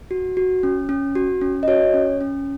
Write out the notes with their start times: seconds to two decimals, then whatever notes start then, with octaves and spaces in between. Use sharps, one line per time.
0.11 F#4
0.37 F#4
0.63 C#4
0.89 C#4
1.15 F#4
1.41 C#4
1.63 D#5
1.68 F#4 C#5
1.94 C#4
2.21 C#4